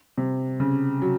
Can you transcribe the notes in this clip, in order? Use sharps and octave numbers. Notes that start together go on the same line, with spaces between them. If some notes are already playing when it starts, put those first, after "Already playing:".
C3
C#3
F#3